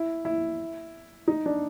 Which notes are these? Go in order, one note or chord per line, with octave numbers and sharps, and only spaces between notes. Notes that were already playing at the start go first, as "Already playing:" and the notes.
Already playing: E4
E4
D#4
D4